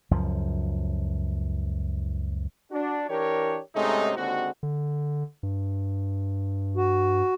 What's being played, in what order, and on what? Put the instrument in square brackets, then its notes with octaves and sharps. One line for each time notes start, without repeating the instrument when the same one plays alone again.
[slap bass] C#2 F#2 F3
[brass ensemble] D4 F#4
E3 D4 G4 A#4 C#5
G#2 C3 G#3 A3 C#4 D#4
D#2 D3 G#3 C4 F#4
[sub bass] D3
G2
[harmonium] F#4